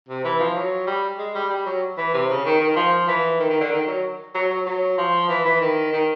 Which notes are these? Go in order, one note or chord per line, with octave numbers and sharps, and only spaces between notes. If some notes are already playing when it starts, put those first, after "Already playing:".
C3
E3
F3
F#3
G3
G#3
G3
G3
F#3
E3
C3
C#3
D#3
D#3
F3
E3
D#3
D#3
D3
D#3
F#3
F#3
F#3
F#3
F3
E3
E3
D#3
D#3